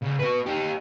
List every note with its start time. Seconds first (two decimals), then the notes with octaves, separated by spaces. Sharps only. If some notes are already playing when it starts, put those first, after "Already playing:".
0.02 C#2
0.19 F#4 B4
0.47 D#4 G4